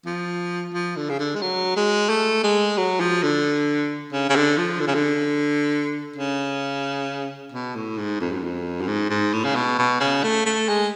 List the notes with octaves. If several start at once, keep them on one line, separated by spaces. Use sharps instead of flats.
F3
F3
D3
C#3
D3
G#3
F#3
G#3
A3
G#3
F#3
F3
D3
C#3
C#3
D3
F3
D3
C#3
D3
C#3
B2
A2
G#2
F2
F#2
F2
F#2
G#2
G#2
A2
C#3
B2
B2
C#3
A3
A3
G#3